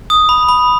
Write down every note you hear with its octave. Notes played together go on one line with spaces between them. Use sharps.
D#6
B5
B5